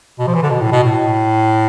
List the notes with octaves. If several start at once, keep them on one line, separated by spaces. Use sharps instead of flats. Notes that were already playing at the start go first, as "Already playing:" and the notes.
B2
F3
E3
D3
B2
A2
B2
A2